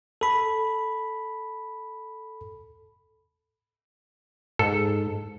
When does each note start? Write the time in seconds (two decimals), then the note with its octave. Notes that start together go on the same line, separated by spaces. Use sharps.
0.21 A4 B5
4.59 G#2 A4